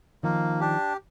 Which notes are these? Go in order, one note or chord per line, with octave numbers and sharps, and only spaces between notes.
D#3 F3 A#3
D4 G4